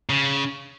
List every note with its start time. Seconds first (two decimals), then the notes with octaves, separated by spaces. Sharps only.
0.09 C#3